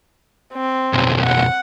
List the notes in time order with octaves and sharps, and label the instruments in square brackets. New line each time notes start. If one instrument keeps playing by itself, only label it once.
[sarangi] C4
[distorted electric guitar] B1 F2
[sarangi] F#5